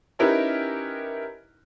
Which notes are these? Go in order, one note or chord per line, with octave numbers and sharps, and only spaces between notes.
C#4 D#4 E4 G4 A#4 B4